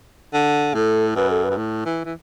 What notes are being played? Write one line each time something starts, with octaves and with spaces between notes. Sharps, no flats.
D3
A2 A4
F#2 B4
A4
B4
F#2
A2
E3
E3